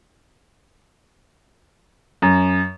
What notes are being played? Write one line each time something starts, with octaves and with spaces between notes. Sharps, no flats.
F#2